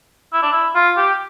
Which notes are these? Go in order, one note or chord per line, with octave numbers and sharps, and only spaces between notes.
E4
D4
E4
F4
G4